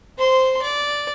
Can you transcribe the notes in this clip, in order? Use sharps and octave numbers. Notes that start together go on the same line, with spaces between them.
C5 C6
D5